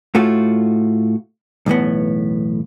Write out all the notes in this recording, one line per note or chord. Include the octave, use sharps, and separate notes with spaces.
A2 A3 F4 F#4
B1 E2 A2 B3